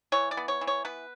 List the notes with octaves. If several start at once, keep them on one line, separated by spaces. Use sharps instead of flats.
E3 C#5
D5
B3
C#5
E3
C#5
B3 B4